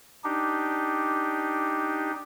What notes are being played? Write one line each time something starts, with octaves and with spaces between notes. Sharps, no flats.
D4 D#4 G4